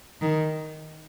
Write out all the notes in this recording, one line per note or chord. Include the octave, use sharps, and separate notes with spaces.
D#3